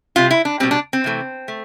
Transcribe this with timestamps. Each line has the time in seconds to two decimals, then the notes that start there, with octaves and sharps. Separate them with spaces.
0.16 C3 G3 F4
0.31 E4
0.45 D4
0.60 G3 C4
0.63 B2
0.71 D4
0.93 C4
1.04 C3 E3 A3
1.48 A3